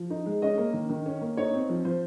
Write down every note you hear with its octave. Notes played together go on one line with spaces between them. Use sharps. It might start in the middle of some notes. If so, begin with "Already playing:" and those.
Already playing: F3
D#4
G#3
C#4 D#5
A#3
D#3
D#3
C#4
A#3
D#4 C#5
C4
F3
F3 C5